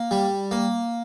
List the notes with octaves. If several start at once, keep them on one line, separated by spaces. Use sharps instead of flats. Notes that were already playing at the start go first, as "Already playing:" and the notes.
Already playing: A#3
G3
A#3